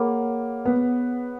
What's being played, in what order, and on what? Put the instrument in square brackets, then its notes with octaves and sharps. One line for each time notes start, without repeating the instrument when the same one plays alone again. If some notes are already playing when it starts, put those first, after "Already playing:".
Already playing: [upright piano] A#3 [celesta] G#4 C#5 F#5 B5 D6
[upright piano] B3